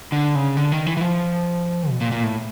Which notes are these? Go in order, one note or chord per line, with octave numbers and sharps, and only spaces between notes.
D3
C#3
D3
D#3
E3
E3
F3
B2
A#2
A#2
A2